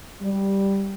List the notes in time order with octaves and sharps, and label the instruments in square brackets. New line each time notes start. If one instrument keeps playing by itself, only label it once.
[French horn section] G3